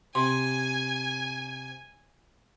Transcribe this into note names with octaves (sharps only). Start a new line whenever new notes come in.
C3 G#5 C6